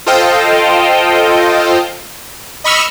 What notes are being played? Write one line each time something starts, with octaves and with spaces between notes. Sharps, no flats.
F4 A4 C5 D#5 F5 G5
D#5 B5 C#6 E6 F6